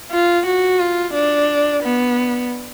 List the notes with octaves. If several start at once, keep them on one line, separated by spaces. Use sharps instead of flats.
F4
F#4
F4
D4
B3